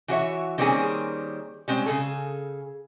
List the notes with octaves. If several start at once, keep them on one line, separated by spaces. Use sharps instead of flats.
E3 F#4 C#5 E5
D#3 G3 A#3 C4 C#4 G#4
G3 G#3 C4 C#4
C#3 G#4 A4